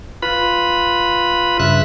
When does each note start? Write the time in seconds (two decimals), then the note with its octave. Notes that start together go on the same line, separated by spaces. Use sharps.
0.22 F4 B4 B5
1.60 G2 C#3 E5 F#6